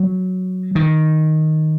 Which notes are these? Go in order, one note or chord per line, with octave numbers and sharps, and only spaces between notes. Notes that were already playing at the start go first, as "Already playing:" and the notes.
Already playing: F#3
D#3